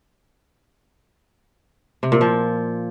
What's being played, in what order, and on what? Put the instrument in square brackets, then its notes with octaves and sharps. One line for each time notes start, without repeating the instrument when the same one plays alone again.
[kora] C3
A#2
F3